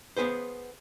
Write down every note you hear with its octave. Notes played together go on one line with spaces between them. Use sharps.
B3 G#4 B4 C5